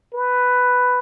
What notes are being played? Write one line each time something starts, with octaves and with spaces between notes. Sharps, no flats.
B4